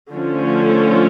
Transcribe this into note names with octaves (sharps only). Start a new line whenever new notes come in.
D3 F3 A3 C#4